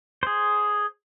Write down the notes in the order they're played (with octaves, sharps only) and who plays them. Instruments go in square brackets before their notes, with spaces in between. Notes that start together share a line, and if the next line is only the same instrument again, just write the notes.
[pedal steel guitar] G#4 C5